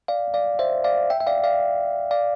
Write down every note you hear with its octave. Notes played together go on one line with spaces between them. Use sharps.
D5 F5
D5 F5
C5 E5
D5 F5
E5 G5
E5
D5 F5
D5 F5
D5 F5